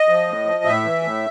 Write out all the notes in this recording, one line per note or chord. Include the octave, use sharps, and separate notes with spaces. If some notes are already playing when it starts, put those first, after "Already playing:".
Already playing: D#5
F3
A2
F3
A2 E5
E3
A2